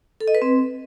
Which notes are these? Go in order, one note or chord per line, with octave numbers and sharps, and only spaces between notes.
A4
D#5
B4
C4